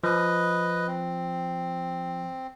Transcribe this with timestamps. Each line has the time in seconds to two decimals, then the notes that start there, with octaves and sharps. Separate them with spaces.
0.04 F3 B4 D#5
0.87 C4